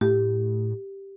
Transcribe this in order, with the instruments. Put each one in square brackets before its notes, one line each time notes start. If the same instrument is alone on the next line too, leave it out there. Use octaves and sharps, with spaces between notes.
[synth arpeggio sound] A2 [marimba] G4